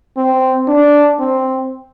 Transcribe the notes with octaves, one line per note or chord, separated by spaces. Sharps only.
C4
D4
C4